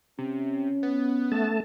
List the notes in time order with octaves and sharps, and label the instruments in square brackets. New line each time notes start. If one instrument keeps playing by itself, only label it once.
[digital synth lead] C3 [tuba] C#4
[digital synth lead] B3
[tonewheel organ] A3 A5